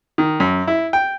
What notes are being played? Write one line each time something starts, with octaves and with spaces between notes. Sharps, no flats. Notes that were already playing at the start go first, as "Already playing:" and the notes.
D#3
F#2
E4
G5